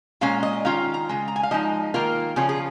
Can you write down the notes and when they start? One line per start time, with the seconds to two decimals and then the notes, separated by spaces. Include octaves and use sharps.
0.21 A#2 G#3 C#4 F5
0.43 D#5
0.65 D#3 C#4 F4 F5
0.94 A#5
1.09 C#3 G#3
1.28 A#5
1.36 G#5
1.43 F5
1.51 F3 G#3 D#4 D#5
1.94 D#3 A#3 F4 A#4
2.36 C#3 F3 C#4 F4 G#4
2.49 G#4